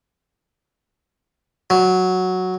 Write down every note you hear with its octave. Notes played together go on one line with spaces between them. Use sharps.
F#3